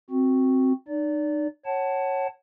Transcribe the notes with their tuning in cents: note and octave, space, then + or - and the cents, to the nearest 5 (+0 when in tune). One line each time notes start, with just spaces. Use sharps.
C4 +0 F#4 -5
D#4 -35 D5 -25
C#5 -15 F#5 +25 A5 +0